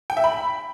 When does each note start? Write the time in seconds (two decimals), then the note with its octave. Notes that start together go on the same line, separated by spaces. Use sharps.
0.10 G5
0.17 E5
0.24 B5